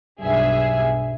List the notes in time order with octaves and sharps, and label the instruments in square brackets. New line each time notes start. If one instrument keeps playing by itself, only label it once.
[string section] B1 G2 G#4 E5